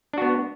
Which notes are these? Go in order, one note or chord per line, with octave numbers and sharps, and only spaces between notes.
B3 D4 F#4